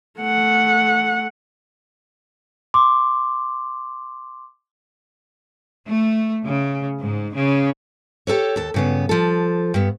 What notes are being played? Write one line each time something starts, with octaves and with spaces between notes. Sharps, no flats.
A3 F#5
C6 D6
A3
C#3
G#2
C#3
G4 A4 B4 C#5
D#2 A4
G2 C#3 B3
F3 A4
G2 B3